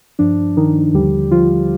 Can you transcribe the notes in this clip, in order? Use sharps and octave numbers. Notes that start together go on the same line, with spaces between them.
G2 F3 D4
D#3 D#4
D#2 D3 F3 G3 G4
F3 F4